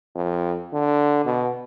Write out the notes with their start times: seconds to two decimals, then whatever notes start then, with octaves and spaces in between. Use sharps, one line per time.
0.15 F2
0.73 D3
1.25 B2